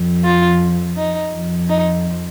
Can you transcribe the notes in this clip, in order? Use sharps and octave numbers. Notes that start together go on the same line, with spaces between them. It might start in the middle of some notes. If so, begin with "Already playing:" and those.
Already playing: F2 F3
F4
D#4
F2 F3
D#4